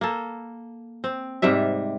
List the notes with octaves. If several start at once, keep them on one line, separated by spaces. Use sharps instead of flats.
A#3 A4
C4
G#2 C3 G3 E5